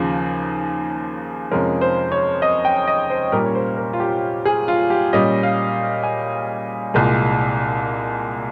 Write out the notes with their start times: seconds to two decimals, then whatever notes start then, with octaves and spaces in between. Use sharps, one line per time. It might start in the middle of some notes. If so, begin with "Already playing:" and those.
Already playing: D#2 C#3 F3 G#4
1.51 F2 C3 F3 G#3 C#4 A#4
1.81 C5
2.12 C#5
2.42 D#5
2.65 G5
2.87 D#5
3.10 C5
3.32 A#2 G3 A#3 C#4 A#4
3.46 C#5
3.55 C5
3.78 A#4
3.93 F4
4.00 G4
4.45 G#4
4.68 F4
4.90 G4
5.13 A#2 G3 C#4 D#5
5.43 F5
6.03 G#5
6.94 C2 A#2 G#3